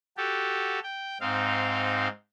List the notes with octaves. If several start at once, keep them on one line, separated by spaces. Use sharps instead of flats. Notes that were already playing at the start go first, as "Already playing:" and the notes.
F#4 G4 A4
G5
G#2 C4 D#4 F5